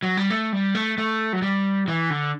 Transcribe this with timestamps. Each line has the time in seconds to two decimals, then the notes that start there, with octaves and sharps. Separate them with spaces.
0.03 F#3
0.17 G3
0.30 A3
0.53 G3
0.75 A3
0.98 A3
1.33 F#3
1.42 G3
1.88 E3
2.10 D3